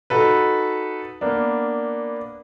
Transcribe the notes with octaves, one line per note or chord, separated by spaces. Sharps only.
D#4 F#4 A4 B4
A#3 B3 D4